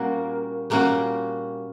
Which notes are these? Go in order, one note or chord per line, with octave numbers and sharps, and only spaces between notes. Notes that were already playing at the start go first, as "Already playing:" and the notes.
Already playing: A#2 G3 A#3 C#4 F#4
A#2 G3 A#3 C#4 F#4